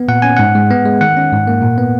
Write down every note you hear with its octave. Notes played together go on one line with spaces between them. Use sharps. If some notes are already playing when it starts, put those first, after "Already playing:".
Already playing: B3
A#2 F#5
C#4 G#5
G#2 F#5
G#3
B3
G#3
D#3 F#5
C#4
G#2
A#3
A#2
B3